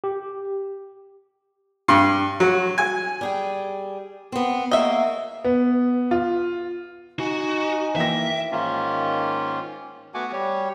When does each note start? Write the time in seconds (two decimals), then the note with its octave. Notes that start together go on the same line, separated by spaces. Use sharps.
0.04 G4
1.88 G2
2.40 F#3
2.78 G#5
3.21 G3 G#4 G5
4.32 B3 C4
4.71 A#3 F#4 G#4 D#5 E5
5.44 B3
6.11 F4
7.20 D#4 F#4 G#5
7.96 E3 A#3 E5 G5 A#6
8.51 G#2 D#3 A#3 C#4 F4
10.14 A3 B3 F#4 F#5 G#5 D6
10.33 G3 G4 C#5